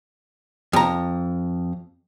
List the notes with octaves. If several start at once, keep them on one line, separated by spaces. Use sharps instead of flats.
F2 A#5